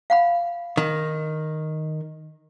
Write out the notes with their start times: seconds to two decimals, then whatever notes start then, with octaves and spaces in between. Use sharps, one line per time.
0.10 F5 F#5 B5
0.77 D#3